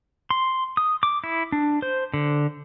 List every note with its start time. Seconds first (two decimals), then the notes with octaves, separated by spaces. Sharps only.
0.31 C6
0.77 D#6
1.03 D6
1.24 E4
1.52 D4
1.82 C5
2.14 D3